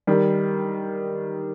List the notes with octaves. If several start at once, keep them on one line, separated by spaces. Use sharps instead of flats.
D#3 G3